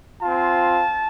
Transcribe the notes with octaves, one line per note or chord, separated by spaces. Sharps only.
C4 F4 A5